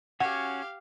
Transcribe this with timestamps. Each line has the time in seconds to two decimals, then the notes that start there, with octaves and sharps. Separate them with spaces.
0.20 C#4 F#4 G4 C#5 F5 F#5